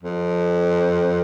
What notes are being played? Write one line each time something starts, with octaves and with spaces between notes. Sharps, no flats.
F2